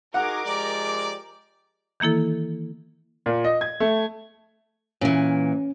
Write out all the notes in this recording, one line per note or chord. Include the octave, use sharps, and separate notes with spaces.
D#4 F#4 G#4 A#4 F#5 D6
F3 G#3 G4 D5
D#3 E3 A#3 E4 A4
A#2
D#5
G#6
A3
A#2 E3 C#4